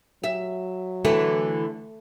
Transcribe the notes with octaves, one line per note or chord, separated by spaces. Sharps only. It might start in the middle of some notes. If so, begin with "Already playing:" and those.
F#3 E5
D3 E3 A3